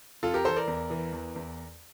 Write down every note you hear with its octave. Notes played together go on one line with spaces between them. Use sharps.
F2 F4 A4
G4 A#4
E3 A4 C5
A#4 D5
E2
E3
E2
E2